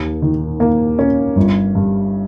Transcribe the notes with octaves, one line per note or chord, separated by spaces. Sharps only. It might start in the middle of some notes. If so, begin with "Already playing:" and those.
Already playing: D#2
D#3
A#3
C#4
G1
G2